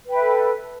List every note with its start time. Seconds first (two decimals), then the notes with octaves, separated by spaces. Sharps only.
0.05 B4
0.10 G5
0.14 E5
0.19 A4